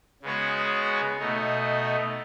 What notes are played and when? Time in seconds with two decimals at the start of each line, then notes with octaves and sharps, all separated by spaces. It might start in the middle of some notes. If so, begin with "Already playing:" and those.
0.23 C#3 G#3 B3 F#4 C#5
1.20 B2 A3 D#4